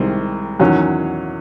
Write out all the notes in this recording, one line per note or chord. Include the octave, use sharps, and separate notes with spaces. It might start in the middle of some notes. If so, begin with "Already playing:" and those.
Already playing: C2 C3 D#3 G#3 C4
E2 D#3 F#3 C#4